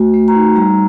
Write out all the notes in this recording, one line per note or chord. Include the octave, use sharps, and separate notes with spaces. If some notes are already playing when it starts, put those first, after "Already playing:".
Already playing: A3 F#4
A3
A#5
D#4
G3 A#5